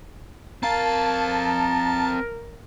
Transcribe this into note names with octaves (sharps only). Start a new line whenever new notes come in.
C4 A#4 F5 A5